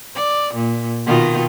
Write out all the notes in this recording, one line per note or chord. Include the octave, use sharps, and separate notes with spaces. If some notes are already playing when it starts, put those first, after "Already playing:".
D5
A#2
B2 D#3 F4